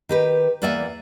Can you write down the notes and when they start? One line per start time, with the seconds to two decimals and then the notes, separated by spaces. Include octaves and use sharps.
0.09 D#3 G4 B4
0.62 E2 A#3 D5 E5 F#5 G#5